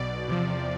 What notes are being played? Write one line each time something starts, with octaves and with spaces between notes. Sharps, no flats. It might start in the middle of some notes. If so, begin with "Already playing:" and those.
Already playing: B1 B2 D5
E2 C3 F3